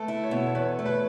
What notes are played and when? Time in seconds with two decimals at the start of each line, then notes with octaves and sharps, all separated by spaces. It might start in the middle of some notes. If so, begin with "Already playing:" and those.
Already playing: A3 A4 B4
0.08 E4
0.24 C#5
0.31 B2
0.46 C#5
0.55 E2 B4
0.79 A3
0.86 B4